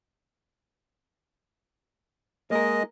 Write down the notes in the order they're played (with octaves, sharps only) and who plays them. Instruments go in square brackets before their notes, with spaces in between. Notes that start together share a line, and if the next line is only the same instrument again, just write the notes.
[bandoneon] G#3 D#5 [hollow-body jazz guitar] A#3 A#4